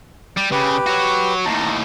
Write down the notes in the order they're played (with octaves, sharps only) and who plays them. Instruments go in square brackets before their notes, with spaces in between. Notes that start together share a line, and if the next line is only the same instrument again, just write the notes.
[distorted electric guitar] G3
[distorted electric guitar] C#3 [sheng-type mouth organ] G4 B4
[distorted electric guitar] F#4 C#5
[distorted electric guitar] D#2 A2 [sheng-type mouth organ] A5 A#5